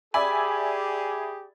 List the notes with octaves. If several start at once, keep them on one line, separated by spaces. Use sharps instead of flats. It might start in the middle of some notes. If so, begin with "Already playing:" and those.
G4 G#4 D5 E5 G#5 B5